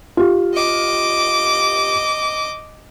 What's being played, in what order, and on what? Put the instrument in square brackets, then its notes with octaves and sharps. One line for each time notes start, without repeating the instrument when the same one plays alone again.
[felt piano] F4 G4
[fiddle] D#5 D6